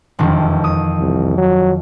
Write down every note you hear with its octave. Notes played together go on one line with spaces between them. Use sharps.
E1 F2 D#3
D#6
C2
F#3